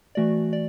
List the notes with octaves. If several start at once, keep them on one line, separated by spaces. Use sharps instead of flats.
E3 A3 F#4 D5
D5